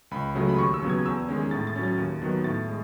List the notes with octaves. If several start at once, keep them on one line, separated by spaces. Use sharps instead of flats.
C#2 B5
C#3 F#3 A3
B5
D#2 C#6
E6
C#3 F#3 B3
G#6
E2 E6
D#3 G#3 C#4
A2 A6
A6
F#3 C#4
A6
D#2
D#3 F#3 B3
A2 A6
G#3